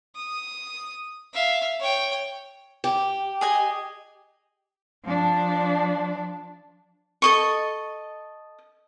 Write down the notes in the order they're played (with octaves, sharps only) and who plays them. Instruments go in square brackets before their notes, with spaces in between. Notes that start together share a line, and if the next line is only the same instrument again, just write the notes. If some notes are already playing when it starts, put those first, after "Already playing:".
[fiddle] D#6
E5 F5
C#5 G5
[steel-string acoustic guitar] G4
[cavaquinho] G#4 D#5 G#5
[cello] F3 D4
[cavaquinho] A4 D#5 C#6